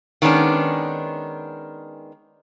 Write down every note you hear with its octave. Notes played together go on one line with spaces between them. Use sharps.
D#3 G#3 B3 C#4 D4